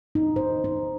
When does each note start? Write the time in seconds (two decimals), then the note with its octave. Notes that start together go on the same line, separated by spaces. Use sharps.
0.15 D#4
0.36 C5
0.64 D#4